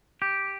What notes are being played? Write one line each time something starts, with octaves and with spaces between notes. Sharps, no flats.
G4